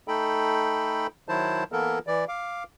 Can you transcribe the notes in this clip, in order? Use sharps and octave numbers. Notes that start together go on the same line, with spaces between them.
A3 D#4 A4 G5 B5
D#3 F#3 E4 C5 A5
E3 A#3 B3 A4 A#4
E3 D5
F5 D6